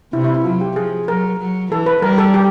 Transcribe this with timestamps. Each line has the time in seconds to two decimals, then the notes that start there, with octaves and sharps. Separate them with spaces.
0.13 C3 E4
0.24 E4
0.34 E4
0.44 F#3 F4
0.61 G4
0.76 F3 G#4
1.07 F#3 A#4
1.39 F#3
1.71 E3 A4
1.86 B4
2.02 G3 A#4
2.18 A4
2.34 G4